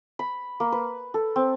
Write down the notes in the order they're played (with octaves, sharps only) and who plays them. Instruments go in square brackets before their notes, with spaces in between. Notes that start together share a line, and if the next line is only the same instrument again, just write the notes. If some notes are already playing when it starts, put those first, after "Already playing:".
[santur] B5
A#3
B4
A4
C4